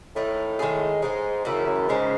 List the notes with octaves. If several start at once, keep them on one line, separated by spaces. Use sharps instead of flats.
A2 D#3 A3 D#4
D#3 G#3 D#4 G#4
G#2 G#3 D#4 G#4
F#2 C#3 E3 A3 E4
F#2
G#2 C#3 G#3 C#4